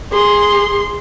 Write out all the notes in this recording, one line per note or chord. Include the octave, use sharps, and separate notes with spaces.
G#4 C6